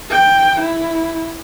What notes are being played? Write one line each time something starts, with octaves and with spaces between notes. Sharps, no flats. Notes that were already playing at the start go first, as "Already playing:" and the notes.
G5
E4